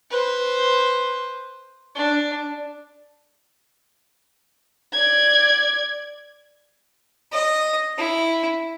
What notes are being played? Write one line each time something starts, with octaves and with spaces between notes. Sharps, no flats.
B4 C5
D4
D5 G#6
D#5
E4